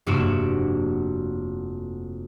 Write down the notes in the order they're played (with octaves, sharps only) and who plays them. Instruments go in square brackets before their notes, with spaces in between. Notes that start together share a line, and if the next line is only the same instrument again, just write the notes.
[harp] F1 G2 A#3 F#4 D7 E7